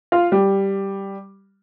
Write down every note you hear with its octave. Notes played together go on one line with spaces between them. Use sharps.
F4
G3